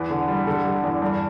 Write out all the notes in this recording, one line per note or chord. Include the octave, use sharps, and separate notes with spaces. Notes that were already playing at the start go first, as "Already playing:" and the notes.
Already playing: E2 B4
D3
G3
D3 A4
G3
E2
G2